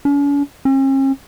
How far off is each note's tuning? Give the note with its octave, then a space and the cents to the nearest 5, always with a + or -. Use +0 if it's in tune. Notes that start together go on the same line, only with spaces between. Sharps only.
C#4 +45
C#4 -45